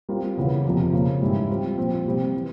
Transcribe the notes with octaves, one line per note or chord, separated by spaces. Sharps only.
G3 C4 F4 A#4
E2 C#3 E3
F2 C3 F3 A#3 F4
C#3 F3 A#3
G#2 E3 G3 C#4 E4
G3 C4 F4
A#2 F3 C4
C3 G3 C4
E3